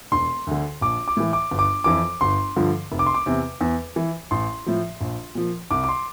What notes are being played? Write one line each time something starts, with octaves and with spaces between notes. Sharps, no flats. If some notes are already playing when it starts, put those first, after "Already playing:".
E1 C6
D2 D3
A#1 D6
D6
A2 E3
D6
G1
D6
F2 E3 D6
G1 C6
G2 D3 F3
F1
D6
C6
D6
E2 C3
E2
E3
A1 C6
A2 F3
A#1
A#2 F3
C2 D6
D6
C6